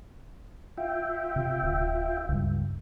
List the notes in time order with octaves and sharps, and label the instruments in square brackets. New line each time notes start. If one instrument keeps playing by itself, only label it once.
[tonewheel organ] F4 E5 G5
[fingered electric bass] C3
D1
C#2 G2